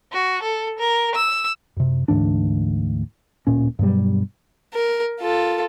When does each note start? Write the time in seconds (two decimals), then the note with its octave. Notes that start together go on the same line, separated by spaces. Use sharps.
0.13 F#4
0.43 A4
0.79 A#4
1.15 E6
1.77 F#2 C3
2.08 D2 G#2 E3 D4
3.47 D1 A#2 C#4
3.79 G2 B2 F#3 G3
4.74 A#4
5.20 F4 A4